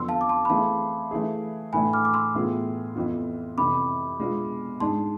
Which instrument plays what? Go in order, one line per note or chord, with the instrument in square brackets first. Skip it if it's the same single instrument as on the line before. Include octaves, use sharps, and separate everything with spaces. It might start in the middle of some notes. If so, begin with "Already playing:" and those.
Already playing: [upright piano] F2 D3 F3 B3 [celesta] C6 E6
[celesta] F5 A5
D6
A5 C6
B5
[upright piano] E3 A3 C4 E4 G#4 [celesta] F5 A5
[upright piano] E3 A3 E4 G#4
[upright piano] A2 E3 A3 D4 [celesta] G#5 B5
[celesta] D6 F6
D6
C6 E6
[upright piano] A2 E3 B3 F4 G#4
F2 E3 B3 F4
[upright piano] F2 C3 E3 [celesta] B5 D6
[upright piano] B2 G#3 B3 D4 F4
[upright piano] G#2 G#3 D4 [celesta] A5 C6